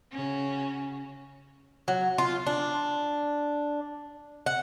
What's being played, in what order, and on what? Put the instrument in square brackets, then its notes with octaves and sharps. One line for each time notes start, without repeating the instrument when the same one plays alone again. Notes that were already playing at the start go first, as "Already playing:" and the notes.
[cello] C#3 [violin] C#4 F#4
[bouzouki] F#3
F4
D4
F#5